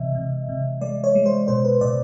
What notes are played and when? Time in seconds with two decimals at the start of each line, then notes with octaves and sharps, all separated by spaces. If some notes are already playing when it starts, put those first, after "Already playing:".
Already playing: C3 E3 G#3 D#5 E5
0.15 C3
0.49 C3
0.81 G#3 D5
1.04 C#5
1.15 G#3
1.26 C5
1.48 B2 C5
1.65 B4
1.81 B2 D5